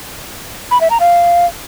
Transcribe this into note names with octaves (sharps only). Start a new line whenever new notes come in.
B5
E5
A#5
F5